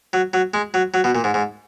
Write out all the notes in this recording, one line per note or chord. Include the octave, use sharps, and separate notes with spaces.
F#3
F#3
G#3
F#3
F#3
B2
A#2
G#2
G#2